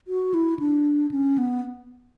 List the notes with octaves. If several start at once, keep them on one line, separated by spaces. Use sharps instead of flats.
F#4
E4
D4
C#4
B3